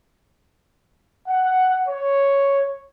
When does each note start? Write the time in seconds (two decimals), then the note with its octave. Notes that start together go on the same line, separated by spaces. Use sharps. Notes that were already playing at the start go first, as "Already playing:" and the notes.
1.27 F#5
1.87 C#5